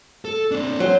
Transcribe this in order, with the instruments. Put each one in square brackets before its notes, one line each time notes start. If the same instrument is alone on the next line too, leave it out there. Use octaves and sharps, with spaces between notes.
[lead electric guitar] A4
C4 D4
[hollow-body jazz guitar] F#3 [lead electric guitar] C5